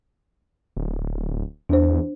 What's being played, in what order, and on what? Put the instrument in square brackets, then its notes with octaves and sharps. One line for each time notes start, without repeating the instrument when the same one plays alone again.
[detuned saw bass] D1
[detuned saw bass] E2 [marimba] D4 C5